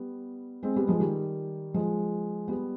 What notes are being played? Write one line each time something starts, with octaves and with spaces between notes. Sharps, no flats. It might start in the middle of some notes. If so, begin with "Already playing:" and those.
Already playing: G3 B3
G#3 C4
G3 B3
F3 G#3
D#3 G3
F3 G#3
G3 B3